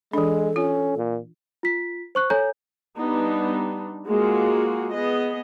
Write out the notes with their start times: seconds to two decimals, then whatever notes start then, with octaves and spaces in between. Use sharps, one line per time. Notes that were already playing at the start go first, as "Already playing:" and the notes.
0.14 E3 G#3 D4 A4
0.56 C#4 F4
0.97 A#2
1.63 F4 B6
2.15 C5 C#6 F#6
2.30 A4 C#5 G#5 A#5 G6
2.99 G3 B3 D4 D#4
4.08 G#3 A#3 F4 F#4 G#4
4.92 B3 G#4 D#5